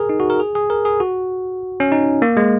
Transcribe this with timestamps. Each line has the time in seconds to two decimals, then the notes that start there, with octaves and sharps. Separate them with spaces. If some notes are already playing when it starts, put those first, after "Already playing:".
Already playing: G#4 A#4
0.09 D#4
0.20 F#4
0.30 A#4
0.40 G#4
0.55 G#4
0.70 A#4
0.85 G#4
1.00 F#4
1.80 C#4
1.92 D#4
2.22 A#3
2.37 G#3